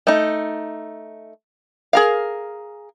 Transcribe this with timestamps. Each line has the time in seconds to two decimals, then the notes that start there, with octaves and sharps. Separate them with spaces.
0.07 A3 D#4
1.93 G#4 A#4 F5